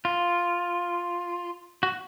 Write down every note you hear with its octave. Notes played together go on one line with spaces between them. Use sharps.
F4
F#4